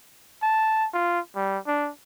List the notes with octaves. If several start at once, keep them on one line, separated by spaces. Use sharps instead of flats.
A5
F4
G3
D4